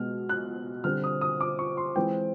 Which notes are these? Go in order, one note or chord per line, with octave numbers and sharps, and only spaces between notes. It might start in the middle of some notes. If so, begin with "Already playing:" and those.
Already playing: B2 G#3 B3 F6
F#6
D3 G3 C4 F6
D#6
D#6
D6
C#6
C6
E3 G#3 C4 G5